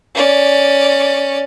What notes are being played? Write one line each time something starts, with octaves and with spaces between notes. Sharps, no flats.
C#4 D5